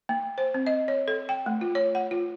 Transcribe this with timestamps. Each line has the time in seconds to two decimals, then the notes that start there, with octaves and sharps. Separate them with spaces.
0.09 A#3
0.38 C5
0.54 C4
0.67 D#5
0.88 C#5
1.08 A4
1.29 G5
1.46 A3
1.61 F4
1.75 C#5
1.95 F#5
2.11 F4